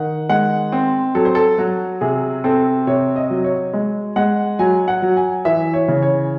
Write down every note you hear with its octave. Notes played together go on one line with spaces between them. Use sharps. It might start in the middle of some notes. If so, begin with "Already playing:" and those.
Already playing: D#3 F#5
G#3 F#5
C4
F#3 A4
C5
A4
F#3 F#4
C3 G#4
C4 A4
C3 C#5
D#5
F#3
C#5
G#3
G#3 F#5
F#3 G#5
F#5
F#3
G#5
E3 E5
C#5
C#3
C#5